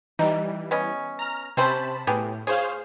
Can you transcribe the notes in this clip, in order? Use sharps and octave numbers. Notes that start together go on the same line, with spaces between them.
E3 G3 D#4
B3 C#4 D#5
A#5 F6
C3 C4 C#4 C5 A5 B5
A2 B3 G4 G#4
F4 G#4 C5 C#5 F5